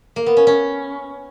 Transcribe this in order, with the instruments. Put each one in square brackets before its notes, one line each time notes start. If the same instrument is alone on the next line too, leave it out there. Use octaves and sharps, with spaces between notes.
[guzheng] A#3
B3
C#4
C#4